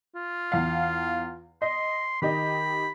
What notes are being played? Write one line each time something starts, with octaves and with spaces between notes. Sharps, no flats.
F4
E2 F5
D#5 C6
D#3 G4 D#5 B5